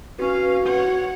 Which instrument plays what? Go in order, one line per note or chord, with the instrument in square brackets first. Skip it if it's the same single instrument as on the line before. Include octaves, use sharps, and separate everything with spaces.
[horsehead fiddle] C#4 F5 [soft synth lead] F#4 [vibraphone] B4 C#6
[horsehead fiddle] C#5 F#5